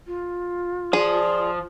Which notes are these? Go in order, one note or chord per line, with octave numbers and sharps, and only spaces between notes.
F4
F3 G#4 D5